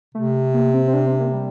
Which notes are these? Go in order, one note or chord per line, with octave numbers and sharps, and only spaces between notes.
C3 A3
A#3
C4
C4
D4
C4
A#3
G3